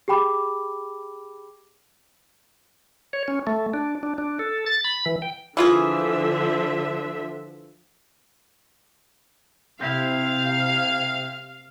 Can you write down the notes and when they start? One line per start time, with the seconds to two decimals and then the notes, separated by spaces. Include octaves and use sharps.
0.08 G4 G#4 G5 B5 D6
3.13 C#5
3.28 C#4
3.47 A3
3.74 D4
4.03 D4
4.18 D4
4.39 A4
4.66 A6
4.84 B5
5.06 E3
5.22 G5
5.57 D3 E3 F3 F4 G#4 E5
9.81 C3 C4 E4 F5